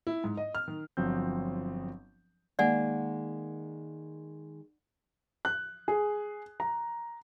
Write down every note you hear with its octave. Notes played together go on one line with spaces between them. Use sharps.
E4
G#2
D#5
F6
D#3
G1 F3 F#3 C4 G6
D#3 G#3 A#3 D5 F#5 G#5
F#6
G#4
A#5